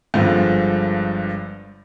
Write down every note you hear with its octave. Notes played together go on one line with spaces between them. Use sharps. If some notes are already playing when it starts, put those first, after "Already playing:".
G1 G2 D3 F3 G#3